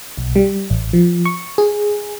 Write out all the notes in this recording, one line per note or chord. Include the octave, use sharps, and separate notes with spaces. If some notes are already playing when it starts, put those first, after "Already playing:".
B1
G3
A1
F3
C#6
G#4